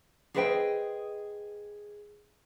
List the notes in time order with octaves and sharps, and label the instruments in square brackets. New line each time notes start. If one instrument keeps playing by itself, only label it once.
[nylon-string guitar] G#4 A4 B4 C5 D#5 G5